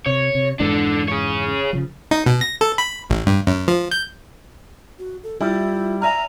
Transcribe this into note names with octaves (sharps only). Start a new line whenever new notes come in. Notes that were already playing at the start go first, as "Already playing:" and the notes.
C3 C#5
C3
F2 G#2 E3 D4 A4
G#4 C#5
C#3 F3
D#4
B2
A#6
A4
B5
A1
G2
F#2
F3
G6
F#4
A4
G3 E4 F4
D5 E5 G#5 A#5 F6